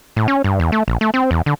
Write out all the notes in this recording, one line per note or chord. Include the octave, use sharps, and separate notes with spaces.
A2
C#4
G2
E2
A3
A#1
A3
C4
E2
D3